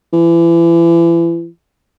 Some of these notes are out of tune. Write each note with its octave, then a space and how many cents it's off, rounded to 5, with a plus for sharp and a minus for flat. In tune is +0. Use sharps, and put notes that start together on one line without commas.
E3 +35